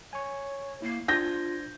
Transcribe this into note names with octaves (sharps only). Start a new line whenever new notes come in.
C#5 G#5 C#6
A#3 E4 C7
D4 F4 C5 G6 G#6 A#6